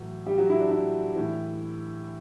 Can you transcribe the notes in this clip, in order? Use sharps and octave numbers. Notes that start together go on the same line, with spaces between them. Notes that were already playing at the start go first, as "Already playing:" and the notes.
Already playing: A2 E3 F#3
G3 G4
F#3 F#4
E4
D4
E4
A2 E3